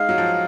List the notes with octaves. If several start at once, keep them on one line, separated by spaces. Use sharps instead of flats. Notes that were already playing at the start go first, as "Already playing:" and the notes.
Already playing: G#3 D#4 F5
F#3
F3